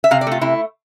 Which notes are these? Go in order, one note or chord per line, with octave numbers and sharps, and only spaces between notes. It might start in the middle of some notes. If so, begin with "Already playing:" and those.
E5
C3 F5
D5
A3 F4
C3 E4